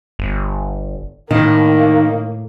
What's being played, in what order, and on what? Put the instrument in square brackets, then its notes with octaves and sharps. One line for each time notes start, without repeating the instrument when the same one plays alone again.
[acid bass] G1
[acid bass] A2 [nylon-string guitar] D#3 [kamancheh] A#3